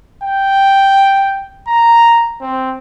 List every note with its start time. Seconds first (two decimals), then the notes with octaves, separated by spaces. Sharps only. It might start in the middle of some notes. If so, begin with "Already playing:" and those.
0.23 G5
1.68 A#5
2.41 C4